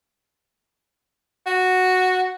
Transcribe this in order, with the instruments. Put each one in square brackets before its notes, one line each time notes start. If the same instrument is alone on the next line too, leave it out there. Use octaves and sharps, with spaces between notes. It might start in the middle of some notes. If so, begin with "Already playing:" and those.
[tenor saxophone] F#4